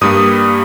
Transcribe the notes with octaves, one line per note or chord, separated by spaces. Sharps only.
G2 G3 A#3 D#6